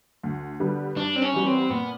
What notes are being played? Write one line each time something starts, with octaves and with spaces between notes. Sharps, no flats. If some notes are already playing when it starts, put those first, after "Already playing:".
D2
D3 G3 B3
G2 D4
C4
C#4
E3 G3 B3
C4
A#2 B3